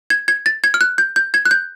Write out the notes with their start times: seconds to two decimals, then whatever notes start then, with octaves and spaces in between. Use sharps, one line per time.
0.10 G#6
0.28 G#6
0.46 A6
0.64 G#6
0.74 F6
0.81 F#6
0.98 G6
1.16 G6
1.34 G#6
1.46 F#6
1.51 G6